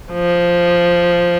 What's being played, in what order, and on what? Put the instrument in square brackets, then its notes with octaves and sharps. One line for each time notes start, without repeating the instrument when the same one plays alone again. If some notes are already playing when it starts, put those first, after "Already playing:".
[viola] F3